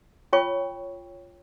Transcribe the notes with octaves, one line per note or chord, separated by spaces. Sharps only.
F4 C#5 G5 C#6